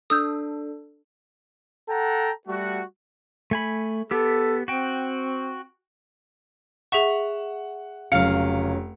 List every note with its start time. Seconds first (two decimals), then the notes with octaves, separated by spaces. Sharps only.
0.10 D4 A4 D#6 E6 G6
1.88 A4 F#5 G5 A5 A#5
2.47 G3 A3 F#4
3.51 A3 G#5 B5
4.11 B3 G4 A4 E6
4.68 C4 F#4 G5
6.92 G#4 E5 F#5 C#6 E7
8.12 F1 C#3 F#3 F5 C#7